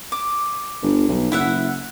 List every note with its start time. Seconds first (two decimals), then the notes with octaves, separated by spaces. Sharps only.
0.12 D6
0.82 G1
1.08 B1
1.32 F#1 E4 E5 F#5